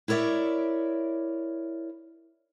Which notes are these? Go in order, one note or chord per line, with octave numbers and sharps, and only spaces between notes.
E4 A#4 C#5 D5 E5